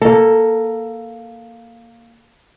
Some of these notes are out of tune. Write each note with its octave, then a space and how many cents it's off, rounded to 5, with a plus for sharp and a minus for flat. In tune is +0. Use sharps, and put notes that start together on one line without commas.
A#3 +0 A4 +10